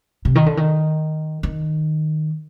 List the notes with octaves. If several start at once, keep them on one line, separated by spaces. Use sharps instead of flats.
C3
D#3
D3
D#3
D#3